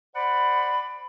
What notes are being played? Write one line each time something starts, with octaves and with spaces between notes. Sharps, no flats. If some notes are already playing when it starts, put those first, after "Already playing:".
C5 D5 F#5 B5